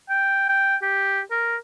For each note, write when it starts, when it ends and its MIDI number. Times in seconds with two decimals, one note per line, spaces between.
0.10 0.49 79
0.49 0.76 79
0.82 1.21 67
1.31 1.57 70